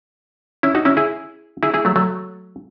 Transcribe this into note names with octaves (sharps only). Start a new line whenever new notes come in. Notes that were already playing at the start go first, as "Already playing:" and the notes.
C#4 E4
D#4 F#4
C#4 E4
E4 G#4
E4 G#4
E4 G#4
F#3 A3
F#3 A3